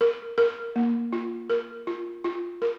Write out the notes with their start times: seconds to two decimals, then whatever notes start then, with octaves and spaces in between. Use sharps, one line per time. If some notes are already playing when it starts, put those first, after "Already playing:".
0.01 A#4
0.38 A#4
0.76 A#3
1.13 F4
1.50 A#4
1.87 F4
2.24 F4
2.62 A#4